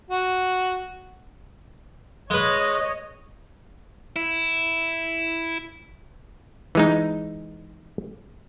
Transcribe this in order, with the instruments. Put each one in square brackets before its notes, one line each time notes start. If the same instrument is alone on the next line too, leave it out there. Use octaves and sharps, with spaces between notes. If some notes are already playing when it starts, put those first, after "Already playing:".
[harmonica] F#4
[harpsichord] G#3 B4 [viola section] C#5 D#5
[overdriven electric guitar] E4
[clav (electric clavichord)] E3 G#3 D#4